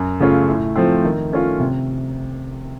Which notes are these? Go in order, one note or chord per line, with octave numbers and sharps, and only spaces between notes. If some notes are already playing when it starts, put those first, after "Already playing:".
Already playing: F#2
C#3 A3 C#4 F4
A2
F3 A3 C4
D#3
A3 C#4 F4
C3